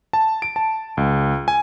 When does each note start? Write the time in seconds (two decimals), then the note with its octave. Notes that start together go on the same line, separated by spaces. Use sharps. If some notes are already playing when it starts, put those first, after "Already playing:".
0.13 A5
0.42 D7
0.56 A5
0.97 C#2
1.48 G#5